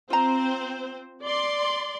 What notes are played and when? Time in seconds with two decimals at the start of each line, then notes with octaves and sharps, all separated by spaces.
0.10 C4 F4 C5 A#5
1.24 D5 C6